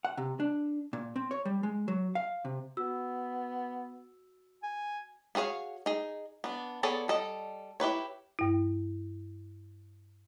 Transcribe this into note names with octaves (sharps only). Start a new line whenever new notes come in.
F#5
C3
D4
A#2
C4
C#5
G3
G#3
F#3
F5
C3
B3 F#4 E6
G#5
B3 F#4 G#4 C#5 F5
D#4 G#4
B3 D4
B3 G#4 A4 C#5 D5
G3 A4 D#5
E4 G4 B4 C#5
G2 E4